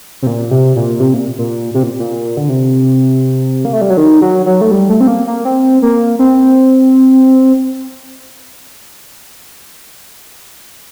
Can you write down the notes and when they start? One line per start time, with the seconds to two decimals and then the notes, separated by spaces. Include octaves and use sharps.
0.22 C3
0.27 A#2
0.51 C3
0.76 A#2
1.00 C3
1.14 A#2
1.38 A#2
1.74 C3
1.83 A#2
1.99 A#2
2.37 D3
2.49 C3
3.65 A#3
3.73 A3
3.81 G3
3.89 F#3
3.97 D#3
4.21 F#3
4.46 F#3
4.61 A3
4.71 G3
4.89 A3
5.00 C4
5.07 A#3
5.27 A#3
5.45 C4
5.82 A#3
6.19 C4